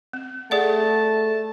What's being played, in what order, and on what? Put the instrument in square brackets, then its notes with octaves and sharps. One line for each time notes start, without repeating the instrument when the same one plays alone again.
[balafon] C4
[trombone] A3 [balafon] G#4 D5 F#5 [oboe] A5